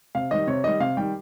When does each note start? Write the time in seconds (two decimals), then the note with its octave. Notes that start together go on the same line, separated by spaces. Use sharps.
0.15 C3 F5
0.31 D#3 G3 D#5
0.47 C3 C#5
0.64 D#3 G3 D#5
0.80 C3 F5
0.97 D#3 G3 G5